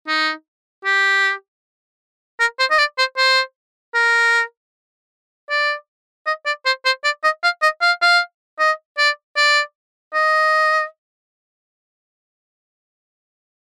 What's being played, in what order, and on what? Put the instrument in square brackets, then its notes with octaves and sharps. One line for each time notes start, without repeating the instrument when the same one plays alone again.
[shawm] D#4
G4
A#4
C5
D#5
D5
C5
C5
A#4
D5
D#5
D5
C5
C5
D5
D#5
F5
D#5
F5
F5
D#5
D5
D5
D#5